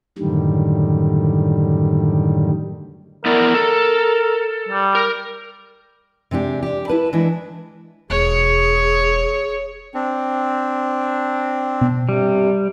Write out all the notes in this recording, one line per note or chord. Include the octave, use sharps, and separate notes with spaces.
F#2 A2 D3 D#3 G3
B3 E4 A#4 D5
A4
G3
A#4
C3 G#3 D4 G4
D4 G4
E4 B4 A5
E3 G#3 D4 E4
E1 G#4 C#5
C4 D4
B2
G2 C3 G3